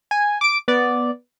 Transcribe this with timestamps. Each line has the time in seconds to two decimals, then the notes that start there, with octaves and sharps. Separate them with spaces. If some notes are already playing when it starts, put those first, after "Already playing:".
0.11 G#5
0.41 D6 D7
0.68 B3 D5